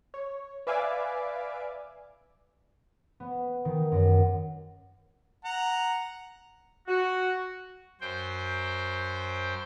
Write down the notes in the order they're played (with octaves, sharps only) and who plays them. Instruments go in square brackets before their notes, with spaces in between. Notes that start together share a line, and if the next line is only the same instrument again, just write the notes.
[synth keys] C#5
B4 D5 E5 F5 G#5 D6
[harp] B3
D#3
F#2
[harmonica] F#5 A#5
[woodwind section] F#4
[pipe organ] F#2 C5 G5